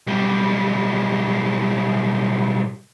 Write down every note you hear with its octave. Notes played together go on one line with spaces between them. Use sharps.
B1 G3